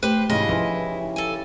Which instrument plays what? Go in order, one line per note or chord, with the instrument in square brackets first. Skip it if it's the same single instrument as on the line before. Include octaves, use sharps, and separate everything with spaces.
[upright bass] A3 [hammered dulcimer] G4 [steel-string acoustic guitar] B4 C5
[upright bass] G#2 E3 [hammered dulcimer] C#3 F4 A5 [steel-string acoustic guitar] E4 D#5
[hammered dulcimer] E3 [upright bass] F3 D#4
[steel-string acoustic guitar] A4 G#5